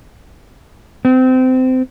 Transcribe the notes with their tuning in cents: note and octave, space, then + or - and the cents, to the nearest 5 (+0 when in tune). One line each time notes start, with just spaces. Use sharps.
C4 -25